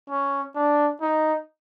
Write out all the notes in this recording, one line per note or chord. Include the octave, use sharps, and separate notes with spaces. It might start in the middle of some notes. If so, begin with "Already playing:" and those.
C#4
D4
D#4